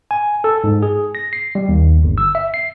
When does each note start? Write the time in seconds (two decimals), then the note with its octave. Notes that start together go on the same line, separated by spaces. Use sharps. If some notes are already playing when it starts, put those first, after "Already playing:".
0.11 G#5
0.44 A4
0.64 G#2
0.82 G#4
1.15 A#6
1.33 C7
1.55 G3
1.69 D#2
2.03 G1
2.18 E6
2.35 E5
2.54 C7